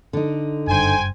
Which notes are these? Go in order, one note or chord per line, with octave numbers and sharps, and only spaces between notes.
D3 D#4
F#1 G2 C5 G5 G#5